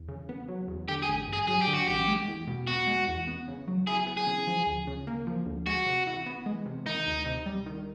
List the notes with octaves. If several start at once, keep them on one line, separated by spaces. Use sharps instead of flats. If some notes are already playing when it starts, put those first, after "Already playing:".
Already playing: E2
C#3
B3
F#3
E2
D3 G4
G#4
A1
G2
G#4
F#3 G#4
G4
D3
F#4
A1 G4
G#3
E2
B2
B3 F#4
G#3
E2
B3
C#3
F#3
E4 G#4
B3
G#4
C#3
F3
D2
C#3
A#3
F3
D2
G#3 F#4
C3
E3
B3
G#3
C3
D#3 D#4
D2
C3
G3
D#3